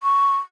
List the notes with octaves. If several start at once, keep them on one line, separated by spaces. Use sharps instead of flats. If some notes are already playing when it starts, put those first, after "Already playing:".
C#6